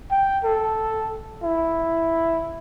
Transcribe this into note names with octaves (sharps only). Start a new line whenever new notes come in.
G5
A4
E4